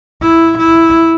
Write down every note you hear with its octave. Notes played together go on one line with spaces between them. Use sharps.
E4
E4